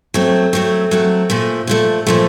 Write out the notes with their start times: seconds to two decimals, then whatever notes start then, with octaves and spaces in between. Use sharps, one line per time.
0.14 F#3 A3 C4
0.53 F#3 A3 C4
0.91 F#3 A3 C4
1.30 A#2 F3 A3
1.67 A#2 F3 A3
2.07 A#2 F3 A3